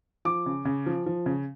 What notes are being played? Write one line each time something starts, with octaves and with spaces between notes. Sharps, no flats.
F3 D6
C#3
C#3
F3
F3
C#3